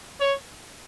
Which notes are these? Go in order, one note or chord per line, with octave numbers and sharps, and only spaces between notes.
C#5